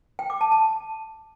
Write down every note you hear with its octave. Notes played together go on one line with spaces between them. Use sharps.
G5
D6
A5
A5